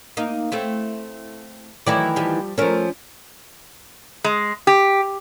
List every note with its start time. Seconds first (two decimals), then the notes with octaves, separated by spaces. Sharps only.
0.17 A#3 D#4
0.52 A3 C4 E4
1.86 D#3 E3 F#3 A3 E4 D5
2.16 F3 G3
2.58 F3 A3 C#4 A#4
4.24 G#3
4.67 G4